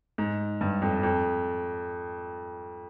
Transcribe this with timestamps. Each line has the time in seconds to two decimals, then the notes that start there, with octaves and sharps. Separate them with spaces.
0.18 G#2
0.61 G2
0.82 F2
1.03 F2